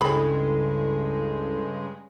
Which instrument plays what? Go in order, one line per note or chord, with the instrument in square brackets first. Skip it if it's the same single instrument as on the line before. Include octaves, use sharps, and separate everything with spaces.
[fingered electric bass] C#2 [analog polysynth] G2 C#3 G#3 [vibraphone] E4 A4 [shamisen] G#4 B5